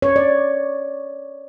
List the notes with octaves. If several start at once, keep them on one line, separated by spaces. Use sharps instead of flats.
C#5
D5